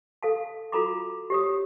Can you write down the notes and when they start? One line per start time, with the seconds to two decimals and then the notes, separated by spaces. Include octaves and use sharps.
0.23 A4 F5 A5
0.72 F4 F#4 A4 A#5 B5 D6
1.30 G4 C#5 D#6